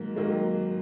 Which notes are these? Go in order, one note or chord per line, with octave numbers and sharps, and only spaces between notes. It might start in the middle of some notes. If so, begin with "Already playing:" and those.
Already playing: G#2 D#3 F#3 A#3
G#2 D#3 F#3 A#3